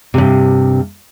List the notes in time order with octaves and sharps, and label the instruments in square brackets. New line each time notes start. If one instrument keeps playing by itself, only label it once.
[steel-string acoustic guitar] G2 C3